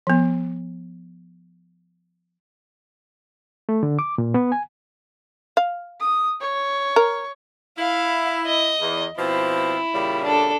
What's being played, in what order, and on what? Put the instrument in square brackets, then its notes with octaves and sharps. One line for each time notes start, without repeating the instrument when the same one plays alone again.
[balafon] F3 B3
[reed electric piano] A3
D3
D6
A#2
B3
G#5
[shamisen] F5
[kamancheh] D#6
C#5
[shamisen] A#4
[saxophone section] E4 [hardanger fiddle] F5
[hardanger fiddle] D#5
[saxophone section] E2
[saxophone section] B2 F3 C4 [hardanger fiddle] E4
[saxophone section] A#2 C#3 G3
[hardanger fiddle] D4 A4